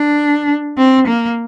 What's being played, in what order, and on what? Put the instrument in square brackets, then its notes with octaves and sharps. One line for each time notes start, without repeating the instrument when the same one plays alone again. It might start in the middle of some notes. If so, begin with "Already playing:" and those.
Already playing: [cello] D4
C4
A#3